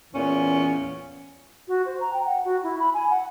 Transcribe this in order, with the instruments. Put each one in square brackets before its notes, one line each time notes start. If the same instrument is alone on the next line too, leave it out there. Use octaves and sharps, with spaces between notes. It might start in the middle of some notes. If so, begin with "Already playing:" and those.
[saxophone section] E2 A#2 E3 C#4
[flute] F#4
C5
A#5
G5
F#5
F#4
E4
B5
G#5
F#5